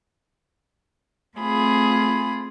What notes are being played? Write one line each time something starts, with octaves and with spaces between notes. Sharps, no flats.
A3 C4 F4 G#4 B5